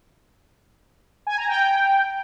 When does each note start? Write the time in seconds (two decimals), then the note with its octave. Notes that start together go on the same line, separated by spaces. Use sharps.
1.27 G#5
1.37 A#5
1.48 G5